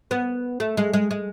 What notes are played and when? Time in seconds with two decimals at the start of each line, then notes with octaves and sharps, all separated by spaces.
0.11 B3
0.60 A3
0.77 G#3
0.93 G#3
1.11 G#3